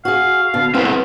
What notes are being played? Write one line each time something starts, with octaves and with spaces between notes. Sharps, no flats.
F#4 G#4 F5
B2 D3
B3 C4 E4 B4